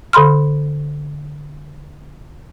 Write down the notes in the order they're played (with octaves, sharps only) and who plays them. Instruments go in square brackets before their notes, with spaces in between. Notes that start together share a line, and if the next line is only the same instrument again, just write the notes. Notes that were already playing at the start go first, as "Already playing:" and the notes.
[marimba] D3 A4 B5 C6 F6